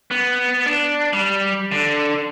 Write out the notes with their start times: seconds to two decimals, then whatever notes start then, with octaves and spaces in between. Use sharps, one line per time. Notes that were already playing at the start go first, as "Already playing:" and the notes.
0.11 B3
0.66 D4
1.13 G3
1.72 D3